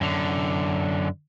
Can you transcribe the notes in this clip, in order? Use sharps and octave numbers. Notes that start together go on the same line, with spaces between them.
F#2 D3